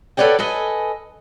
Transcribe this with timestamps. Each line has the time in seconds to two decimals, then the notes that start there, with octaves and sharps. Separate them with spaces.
0.17 A4 B4 C#5 D5 F#5 G5
0.39 A4 B4 D#5 G#5